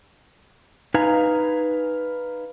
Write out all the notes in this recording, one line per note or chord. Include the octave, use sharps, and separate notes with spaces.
D#4 B4 F5 G#5 A#5